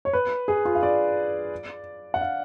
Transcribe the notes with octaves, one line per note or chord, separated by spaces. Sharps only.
C#5
B4
G#4
F4
F5
D5
F#5
F5